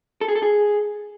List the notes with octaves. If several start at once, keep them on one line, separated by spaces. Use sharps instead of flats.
A4
G#4
A4
G#4